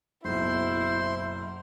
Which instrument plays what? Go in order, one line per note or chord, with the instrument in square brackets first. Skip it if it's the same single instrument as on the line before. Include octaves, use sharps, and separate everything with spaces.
[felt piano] F#1 B1 [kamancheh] E4 [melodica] C5 C6